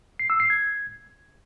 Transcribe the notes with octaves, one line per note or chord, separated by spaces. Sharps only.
C7
E6
C7
G#6